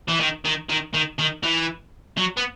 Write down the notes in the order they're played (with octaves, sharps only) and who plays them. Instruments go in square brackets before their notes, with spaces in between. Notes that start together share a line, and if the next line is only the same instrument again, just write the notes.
[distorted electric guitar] E3
D#3
D#3
D#3
D#3
D#3
E3
F#3
B3